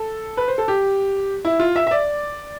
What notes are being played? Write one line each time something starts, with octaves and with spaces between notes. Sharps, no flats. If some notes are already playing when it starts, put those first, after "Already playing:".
Already playing: A4
B4
C5
A4
G4
E4
F4
E5
E5
D5